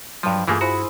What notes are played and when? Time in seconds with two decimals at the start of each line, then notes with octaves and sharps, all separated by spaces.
0.23 G2 F3 F#3
0.48 G2 E3 A3 A#3 F4 G#4 G#5
0.61 E4 F#4 C5 B5